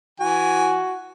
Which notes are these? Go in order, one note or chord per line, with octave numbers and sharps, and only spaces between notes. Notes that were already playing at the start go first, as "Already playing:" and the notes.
E3 F#4 G#5